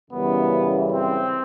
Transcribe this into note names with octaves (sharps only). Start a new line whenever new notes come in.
F#2 C#3 E3 G3 B3
C4